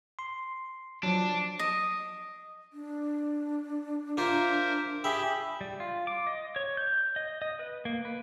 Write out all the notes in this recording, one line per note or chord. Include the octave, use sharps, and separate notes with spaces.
C6
F3 F#3 D4
D#5
D4
A#3 F4 A#4 C5 E5
G4 G#4 E5 G5 B5
G3
F4
D6
D#5
C#5
G6
D#5
D#5
B4
A#3
B4